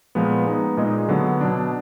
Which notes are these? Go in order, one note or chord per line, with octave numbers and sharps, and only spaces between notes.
A#2 F3 G#3 B3
G#3 B3 D#4
A#2 G#3 D#4 G#4 D#5
D3 F#3 B3
B2 F#3 D4